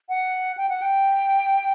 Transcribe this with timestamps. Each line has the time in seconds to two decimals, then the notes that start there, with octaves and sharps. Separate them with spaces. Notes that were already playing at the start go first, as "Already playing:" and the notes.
0.09 F#5
0.58 G5
0.69 F#5
0.82 G5